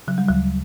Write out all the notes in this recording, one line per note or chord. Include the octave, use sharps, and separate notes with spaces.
C#3 F#3
G3
D2 F#3